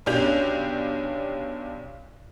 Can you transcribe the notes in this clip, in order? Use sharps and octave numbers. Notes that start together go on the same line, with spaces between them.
B1 C#4 D4 G4 G6 F7